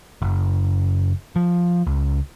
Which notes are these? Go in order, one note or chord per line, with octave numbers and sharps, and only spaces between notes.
F#1
F3
C#2